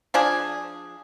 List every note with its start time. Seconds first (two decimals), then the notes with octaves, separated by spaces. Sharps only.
0.14 F3 D4 G#4